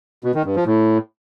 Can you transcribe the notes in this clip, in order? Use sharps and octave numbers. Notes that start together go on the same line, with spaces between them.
B2
D#3
G2
F3
A2